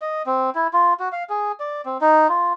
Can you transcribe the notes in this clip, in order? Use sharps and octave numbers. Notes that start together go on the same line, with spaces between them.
D#5
C4
E4
F4
F#4
F5
G#4
D5
C4
D#4
F4